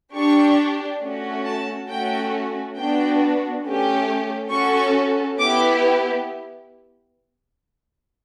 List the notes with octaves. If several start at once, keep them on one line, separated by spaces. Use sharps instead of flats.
D4 G4 C#6
A3 C#4 F#4
A5
A3 C#4 F#4 G5
B3 D4 F#4 G5
A3 C#4 G4
C#4 F#4 A4 C#6
B3 E4 G4 D6